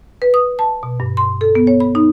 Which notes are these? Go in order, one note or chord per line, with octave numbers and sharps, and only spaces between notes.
B4
D#6
A5
B2
G2
C6
A4
B3
C#5
B5
D#4